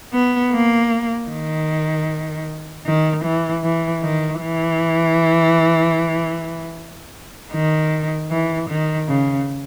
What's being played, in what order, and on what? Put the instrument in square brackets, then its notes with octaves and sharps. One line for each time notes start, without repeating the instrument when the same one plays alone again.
[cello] B3
A#3
D#3
D#3
E3
E3
D#3
E3
D#3
E3
D#3
C#3